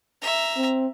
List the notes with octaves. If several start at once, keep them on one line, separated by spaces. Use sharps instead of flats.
E5 A#5
C4